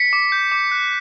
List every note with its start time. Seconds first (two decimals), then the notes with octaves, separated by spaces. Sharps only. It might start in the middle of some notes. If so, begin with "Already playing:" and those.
Already playing: B6 C#7
0.13 D6
0.32 G6
0.52 D6
0.71 F#6